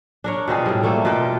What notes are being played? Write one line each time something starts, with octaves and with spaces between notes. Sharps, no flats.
D4 A#4 C#5
B2 C4 F4 G#4
A2 G3
A3 A#3 A4
B2 F4 D5 G5